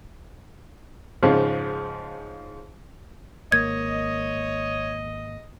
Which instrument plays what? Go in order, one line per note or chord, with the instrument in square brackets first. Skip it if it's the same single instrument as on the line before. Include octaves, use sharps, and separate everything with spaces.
[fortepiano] G#2 C#3 F3
[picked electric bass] G#1 A#3 [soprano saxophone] C#5 [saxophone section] D#5 [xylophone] G#6